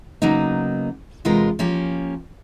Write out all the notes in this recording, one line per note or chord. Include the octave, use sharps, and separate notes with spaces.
C#3 F#3 A#3 B3 D#4
E2 C3 G#3 F4 A#4 B4
F3 A#3 C#4 G4